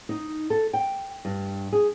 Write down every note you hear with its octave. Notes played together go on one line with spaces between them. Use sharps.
D#4
A4
G5
G2
G#4